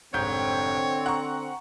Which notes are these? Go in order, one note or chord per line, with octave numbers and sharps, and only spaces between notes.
F1 G#2 D3 C4 C#5 G6
F#5 A#5 C#6